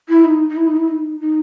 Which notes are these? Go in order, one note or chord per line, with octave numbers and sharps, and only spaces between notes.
E4
D#4
D#4
E4
D#4
E4
D#4
D#4